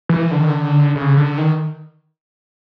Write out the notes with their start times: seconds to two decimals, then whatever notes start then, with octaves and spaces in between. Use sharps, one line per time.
0.09 E3
0.31 D3
0.40 D#3
0.49 D3
0.95 C#3
1.17 D3
1.38 D#3